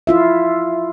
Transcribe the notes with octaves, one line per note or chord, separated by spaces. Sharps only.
E4 F4 E5